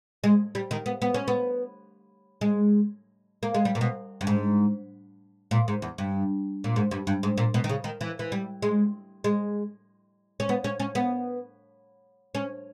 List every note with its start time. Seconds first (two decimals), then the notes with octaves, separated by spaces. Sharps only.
0.24 G#3
0.55 G3
0.71 D#3
0.86 B3
1.02 B3
1.14 C#4
1.28 B3
2.41 G#3
3.43 A#3
3.54 G#3
3.65 G3
3.75 A#2
3.81 B2
4.21 G2
4.27 G#2
5.51 A#2
5.68 G#2
5.82 E2
5.98 G2
6.64 A#2
6.76 G#2
6.91 G2
7.07 G2
7.23 G#2
7.38 A#2
7.54 B2
7.64 D#3
7.70 C#3
7.84 D#3
8.01 E3
8.19 E3
8.32 G3
8.62 G#3
9.24 G#3
10.40 C#4
10.49 B3
10.64 C#4
10.80 C#4
10.95 B3
12.35 C#4